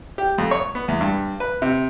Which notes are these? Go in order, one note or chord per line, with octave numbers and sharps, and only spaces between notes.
G4
F2
C#5
B3
E2
G2
B4
C3